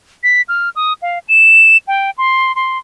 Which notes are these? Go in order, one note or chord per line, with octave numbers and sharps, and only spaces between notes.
B6
F6
D#6
F5
E7
G5
C6
C6